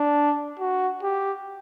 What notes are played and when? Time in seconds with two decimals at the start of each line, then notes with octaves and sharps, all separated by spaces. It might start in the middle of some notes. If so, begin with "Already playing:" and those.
Already playing: D4
0.60 F#4
1.03 G4